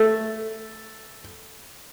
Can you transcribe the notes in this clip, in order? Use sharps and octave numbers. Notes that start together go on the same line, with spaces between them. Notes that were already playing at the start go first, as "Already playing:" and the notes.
Already playing: A3